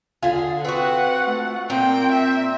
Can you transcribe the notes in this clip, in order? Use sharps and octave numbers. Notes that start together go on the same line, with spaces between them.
D3 F4 G#4
C4 F#4 B4 F#5
A3
A#2 C4 G5
E5